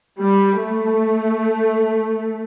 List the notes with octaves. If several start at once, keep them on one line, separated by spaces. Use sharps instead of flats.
G3
A3